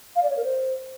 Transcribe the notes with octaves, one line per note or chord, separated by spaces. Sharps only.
F5
D5
C#5
A#4
C5